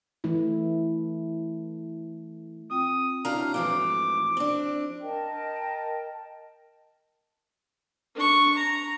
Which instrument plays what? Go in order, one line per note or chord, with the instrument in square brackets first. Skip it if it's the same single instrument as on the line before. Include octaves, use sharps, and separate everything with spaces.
[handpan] E3 A3 E4
[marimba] C4 F4 G5 [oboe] D#6
[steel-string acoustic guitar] A2 D4 A#5 [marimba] E4 F#4 [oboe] F5
[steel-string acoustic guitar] G#2 E3 A3 [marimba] F3 [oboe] D6
[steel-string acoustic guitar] C4 D4
[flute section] A#4 D#5 G5 A5
[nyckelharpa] D4 C#6
A#5